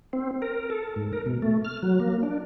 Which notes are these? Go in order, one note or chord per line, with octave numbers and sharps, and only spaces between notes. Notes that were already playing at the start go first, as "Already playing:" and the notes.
C4
A#4
A4
G#2
A#4
B2
A3
F6
F#3
A#3
D4